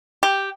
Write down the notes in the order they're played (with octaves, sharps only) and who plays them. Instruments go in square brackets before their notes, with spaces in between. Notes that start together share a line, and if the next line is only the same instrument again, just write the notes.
[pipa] G4